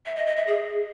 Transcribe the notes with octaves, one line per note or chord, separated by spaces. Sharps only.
E5
D#5
D#5
E5
G#4